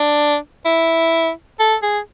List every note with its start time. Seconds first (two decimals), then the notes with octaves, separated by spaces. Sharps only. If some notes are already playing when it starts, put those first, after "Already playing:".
Already playing: D4
0.65 E4
1.59 A4
1.83 G#4